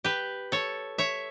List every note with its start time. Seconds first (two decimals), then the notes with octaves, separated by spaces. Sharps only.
0.04 G4 B4
0.52 A4 C#5
0.98 C#5 E5